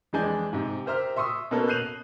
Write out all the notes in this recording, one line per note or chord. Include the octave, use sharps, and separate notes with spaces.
F2 E3 G#3 D4 G#5 G6
G#2 C3
G4 A#4 C5 E5 A#5 F6
E5 C6 C#6 D#6 E6
B2 A#3 B3 C#4 A4 A#4
F#6 G6 C7 D#7 F7 F#7